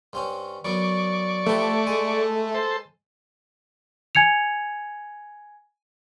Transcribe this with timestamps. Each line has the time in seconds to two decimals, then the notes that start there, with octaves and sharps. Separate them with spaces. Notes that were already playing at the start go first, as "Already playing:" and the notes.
0.13 G2 C4 C#4
0.65 F#2 F#3 B3 D5 C#6
1.46 F3 A3 G4 B4
1.87 G#3 G#5
2.54 A4 C5
4.15 G#5 G#6 C#7 F7